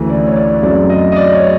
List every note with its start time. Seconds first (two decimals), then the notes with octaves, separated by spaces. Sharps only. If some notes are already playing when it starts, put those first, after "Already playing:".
Already playing: D2 C#3 E3 A3
0.09 D5
0.27 C#5
0.36 D5
0.63 F#2 C#3 F#3 A3 C4 D5
0.89 D#5
1.12 D#5
1.16 D5
1.34 C#5